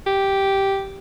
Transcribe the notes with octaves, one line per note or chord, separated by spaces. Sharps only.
G4